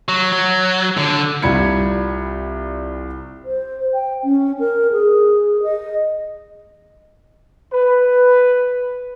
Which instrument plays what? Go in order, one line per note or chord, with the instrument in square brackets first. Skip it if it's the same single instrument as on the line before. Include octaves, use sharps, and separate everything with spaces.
[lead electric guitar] F#3
F#3
D3
[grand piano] C2 G3 F4 B5 G#6 C#7
[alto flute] C5
G5
C#4
A#4
G#4
D#5
[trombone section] B4